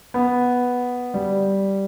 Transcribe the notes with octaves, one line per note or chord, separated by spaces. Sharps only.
B3
G3